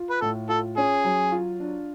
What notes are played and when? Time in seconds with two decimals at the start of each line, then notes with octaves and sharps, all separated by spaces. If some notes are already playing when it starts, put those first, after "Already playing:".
Already playing: F4
0.10 B4
0.21 A2 A4
0.49 F4 A4
0.77 C#4 G#4
1.04 F#3
1.32 F4
1.60 D4